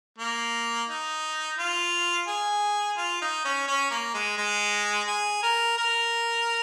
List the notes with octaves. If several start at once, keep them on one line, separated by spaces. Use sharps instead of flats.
A#3
D#4
F4
G#4
F4
D#4
C#4
C#4
A#3
G#3
G#3
G#4
A#4
A#4